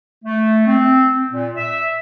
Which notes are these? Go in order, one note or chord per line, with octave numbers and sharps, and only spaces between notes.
A3
C4
A#2
E5